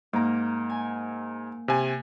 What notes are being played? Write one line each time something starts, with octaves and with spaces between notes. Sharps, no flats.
G#2 A#3 A#5
G#5
C3 G#5